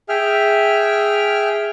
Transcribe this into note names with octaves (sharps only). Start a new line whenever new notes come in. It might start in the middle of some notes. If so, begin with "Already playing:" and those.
G#4 E5 G5 F6